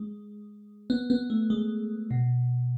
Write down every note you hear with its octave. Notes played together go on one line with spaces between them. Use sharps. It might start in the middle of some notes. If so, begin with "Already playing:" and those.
Already playing: G#3
B3
B3
A3
G#3
B2